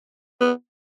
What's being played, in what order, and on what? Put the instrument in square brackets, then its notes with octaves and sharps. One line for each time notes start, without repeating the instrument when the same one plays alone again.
[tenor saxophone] B3